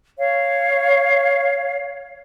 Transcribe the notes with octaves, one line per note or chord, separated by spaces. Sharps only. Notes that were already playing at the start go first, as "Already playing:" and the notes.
C#5 F5